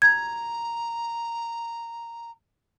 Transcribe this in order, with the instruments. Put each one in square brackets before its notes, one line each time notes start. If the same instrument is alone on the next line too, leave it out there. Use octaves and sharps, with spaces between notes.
[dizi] A#5 [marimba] G#6